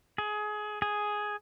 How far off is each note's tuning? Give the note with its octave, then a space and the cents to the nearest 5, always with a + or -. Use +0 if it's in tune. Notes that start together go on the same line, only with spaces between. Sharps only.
G#4 +20
G#4 +5